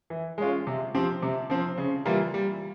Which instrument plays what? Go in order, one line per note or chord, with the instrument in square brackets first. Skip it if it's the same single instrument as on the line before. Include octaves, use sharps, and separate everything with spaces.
[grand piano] E3
G#3 C#4 F4
C3
F3 C4 G4
C3
F3 C4
C#3
E3 G3 A#3 F4
G3